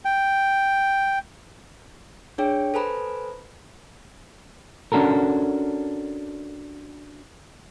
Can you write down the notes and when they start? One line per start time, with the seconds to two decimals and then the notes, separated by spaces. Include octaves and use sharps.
0.05 G5
2.38 D4 G#4 C#5 G5
2.74 A4 B4 C5 G#5 A#5 B5
4.92 C#4 D4 F#4 A4 A#4